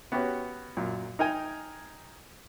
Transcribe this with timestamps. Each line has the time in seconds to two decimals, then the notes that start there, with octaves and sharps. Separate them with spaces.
0.12 B3 C#4 F#4 G4
0.77 F#2 A#2
1.19 D#4 A#4 G5 G#5 A#5